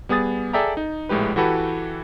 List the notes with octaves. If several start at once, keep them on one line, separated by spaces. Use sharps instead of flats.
G3 B3 G#4 D#6 A6
G#4 A4 D5 E5 G5 A#5
D#4
A#1 A2 G#3 G4 B4
E3 E4 F#4 G4 A4 B4